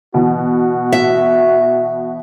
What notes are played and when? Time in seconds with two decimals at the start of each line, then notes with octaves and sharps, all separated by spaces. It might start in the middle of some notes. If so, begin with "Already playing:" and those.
0.14 B2 E3 F#4
0.93 E5